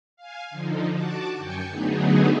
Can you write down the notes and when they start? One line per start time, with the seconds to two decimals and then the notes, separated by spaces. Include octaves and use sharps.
0.16 F5 G#5
0.50 D3 F3 D#4
0.93 F#4 A5 D6
1.38 F#2 G5 G#5 G6 C#7
1.69 D3 F#3 A3 B3 D#4 G#4